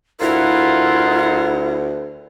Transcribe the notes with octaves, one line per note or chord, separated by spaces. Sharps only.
D2 E4 F4 A#4 F#5